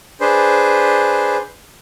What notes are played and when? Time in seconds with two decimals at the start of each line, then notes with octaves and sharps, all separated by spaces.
0.21 D4 G#4 B4 C5